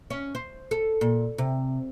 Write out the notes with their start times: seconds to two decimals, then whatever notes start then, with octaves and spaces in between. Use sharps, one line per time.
0.10 C#4
0.35 C5
0.71 A4
1.01 A#2
1.38 C3